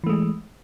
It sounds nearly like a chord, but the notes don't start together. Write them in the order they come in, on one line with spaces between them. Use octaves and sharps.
E3 A3 G#3